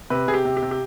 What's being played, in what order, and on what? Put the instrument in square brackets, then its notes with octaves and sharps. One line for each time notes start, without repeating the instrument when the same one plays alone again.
[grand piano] C3 B4
C3 G#4
G4
C3
G4
C3
G4